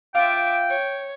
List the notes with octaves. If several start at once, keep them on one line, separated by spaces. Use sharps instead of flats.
F4 E5 G5 D6
C#5